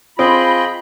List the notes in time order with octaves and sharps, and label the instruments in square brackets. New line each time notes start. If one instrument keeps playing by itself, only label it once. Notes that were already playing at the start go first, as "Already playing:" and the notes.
[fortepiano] C4 [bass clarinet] F4 [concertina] G#4 D#5 G5 [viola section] B5